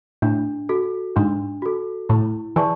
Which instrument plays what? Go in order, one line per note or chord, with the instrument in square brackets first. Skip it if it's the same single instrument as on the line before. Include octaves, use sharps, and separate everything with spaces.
[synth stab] A2 [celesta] D4
[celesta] F#4 A4
[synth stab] G#2 [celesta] D4
[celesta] F#4 A4
[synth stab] A2 [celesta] E4
[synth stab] E3 [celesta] G#4 D5 A5 C#6